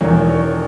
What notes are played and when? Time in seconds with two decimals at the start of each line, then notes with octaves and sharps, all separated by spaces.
0.01 E1 E2 D#3 C#5
0.29 C#5